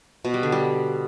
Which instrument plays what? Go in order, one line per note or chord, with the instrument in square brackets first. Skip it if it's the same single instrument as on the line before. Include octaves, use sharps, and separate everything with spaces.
[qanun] B2
G3
D3
G3